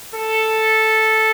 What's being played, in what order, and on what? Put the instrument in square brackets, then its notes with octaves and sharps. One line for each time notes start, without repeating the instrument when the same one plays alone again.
[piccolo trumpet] A4